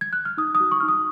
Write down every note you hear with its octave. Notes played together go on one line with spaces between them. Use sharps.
G#6
F#6
F6
D#4 D#6
D#6
F#4
C#6
D#4 F6
D#6